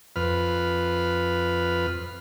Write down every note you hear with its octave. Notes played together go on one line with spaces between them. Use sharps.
F2 B4 F6